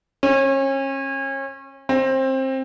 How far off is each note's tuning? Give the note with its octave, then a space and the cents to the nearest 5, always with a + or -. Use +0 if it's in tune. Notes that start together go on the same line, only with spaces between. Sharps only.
C#4 -35
C4 +20